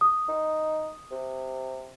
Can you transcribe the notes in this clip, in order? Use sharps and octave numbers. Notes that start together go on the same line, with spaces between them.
D#6
D#4
C3